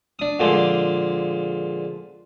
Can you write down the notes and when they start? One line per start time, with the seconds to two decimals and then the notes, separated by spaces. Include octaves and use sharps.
0.19 D4 D#6
0.40 A#2 D3 F3 G#3